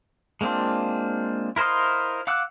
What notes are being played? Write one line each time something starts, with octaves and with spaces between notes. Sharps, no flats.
G#3 A#3 C4 D4 F4
E4 A#4 C5 D#5 F5
F5 F#5 D6 E6 F#6